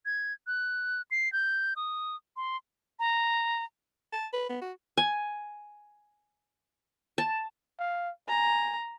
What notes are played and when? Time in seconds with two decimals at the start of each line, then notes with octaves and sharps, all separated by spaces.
0.06 G#6
0.47 F#6
1.11 C7
1.33 G6
1.76 D#6
2.36 C6
2.99 A#5
4.13 A5
4.33 B4
4.49 B3
4.61 F#4
4.97 G#5
7.18 A5
7.79 F5
8.29 G#5 A#5